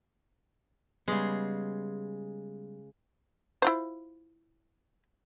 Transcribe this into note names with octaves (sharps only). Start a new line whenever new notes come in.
C#3 G3 G#3 B3
E4 F4 C5